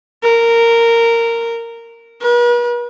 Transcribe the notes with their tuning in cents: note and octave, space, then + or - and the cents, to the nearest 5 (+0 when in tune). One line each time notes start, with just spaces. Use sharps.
A#4 -10
B4 -45